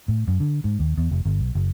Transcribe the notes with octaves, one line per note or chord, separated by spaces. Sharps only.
A2
F#2
D3
G#2
D#2
E2
F1
G1
B1
F#1